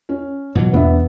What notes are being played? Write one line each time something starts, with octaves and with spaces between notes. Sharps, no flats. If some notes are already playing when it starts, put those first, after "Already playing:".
C#4
G#2 B2 E3 F#3
E2 B3 D4 E5